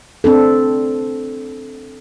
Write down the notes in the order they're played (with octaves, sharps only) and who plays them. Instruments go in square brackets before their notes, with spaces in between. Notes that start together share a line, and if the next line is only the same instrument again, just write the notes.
[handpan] C4 D4 A4